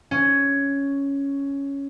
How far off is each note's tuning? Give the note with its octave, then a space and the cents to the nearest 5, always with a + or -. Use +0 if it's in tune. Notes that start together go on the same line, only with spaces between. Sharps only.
C#4 +5